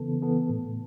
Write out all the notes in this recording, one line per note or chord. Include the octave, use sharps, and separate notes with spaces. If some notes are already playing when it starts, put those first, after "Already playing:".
Already playing: C#3 E3 B3 A4
E3 B3 A4
A2